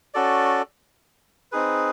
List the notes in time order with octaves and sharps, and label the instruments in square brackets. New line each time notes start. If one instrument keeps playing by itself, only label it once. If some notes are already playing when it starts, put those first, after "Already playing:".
[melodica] C#4 F#4 A4 D5
C4 D#4 G#4 B4